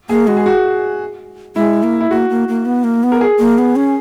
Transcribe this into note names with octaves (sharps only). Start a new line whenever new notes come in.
A#3 G#4
G#3 F#4
G#4
F#4
G#3 E4
A#3
E4
A#3 F#4
A#3
A#3
B3
A#3
B3
A#4
G#4
A#3
B3
C#4